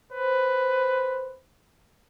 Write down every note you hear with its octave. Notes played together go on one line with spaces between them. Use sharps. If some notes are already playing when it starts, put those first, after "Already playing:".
B4 C5